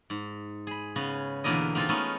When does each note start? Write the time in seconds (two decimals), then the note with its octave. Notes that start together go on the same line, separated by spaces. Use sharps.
0.10 G#2
0.67 G#4 B5
0.96 C#3 B3 C#4
1.44 E2 B2 D3 A#3 E4 D#5
1.75 A#3 C4 D#4 F4 A4
1.89 G#3 A3 B3 C#4 D#4